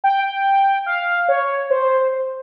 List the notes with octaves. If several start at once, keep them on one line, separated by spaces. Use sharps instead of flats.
G5
F5
C#5
C5